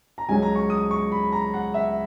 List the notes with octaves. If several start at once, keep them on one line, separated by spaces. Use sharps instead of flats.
A#5
C#2 C#3 F#3 C#4 G#5
A#5
C#6
D#6
C#6
B5
A#5
F#5
E5